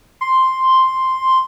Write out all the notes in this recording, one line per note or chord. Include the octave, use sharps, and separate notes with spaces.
C6